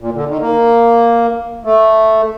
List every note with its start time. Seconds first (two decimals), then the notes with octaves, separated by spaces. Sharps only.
0.01 A#2
0.15 D3
0.28 D#3
0.41 A#3
1.65 A3